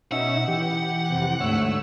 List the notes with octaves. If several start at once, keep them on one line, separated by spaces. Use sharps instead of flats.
B2 C#4 D#4 E5 F#5
E3 G4
F2 C3
D2 G#2 A3 C#5 E6